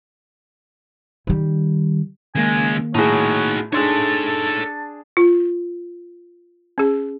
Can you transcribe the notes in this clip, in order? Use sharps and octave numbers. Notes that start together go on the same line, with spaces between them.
D#3 G3
C#2 D#3 G#3 A#3 G#5
A2 D#4 F#4 G#4 C#5
D4 D#4 G#4 A4 C#5 A5 C6
F4
C#4 G#4